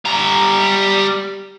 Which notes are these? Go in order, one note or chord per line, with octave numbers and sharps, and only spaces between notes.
G3 A#5